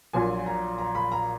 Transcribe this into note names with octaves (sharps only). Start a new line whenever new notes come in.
A#1 A#2 F#3 G#5
A#5
A#5
B5
A#5